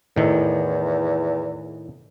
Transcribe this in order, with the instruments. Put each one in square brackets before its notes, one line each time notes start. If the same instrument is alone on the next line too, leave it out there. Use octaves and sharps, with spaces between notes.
[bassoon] E2 [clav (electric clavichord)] A2 D#3 E5